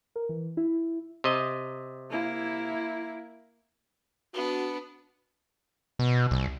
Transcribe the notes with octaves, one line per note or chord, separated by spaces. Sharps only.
A#4
E3
E4
C3 D#5
A#3 E4
B3 D4 F#4
B2
C2